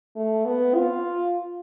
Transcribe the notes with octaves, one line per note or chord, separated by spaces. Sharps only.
A3
B3
F4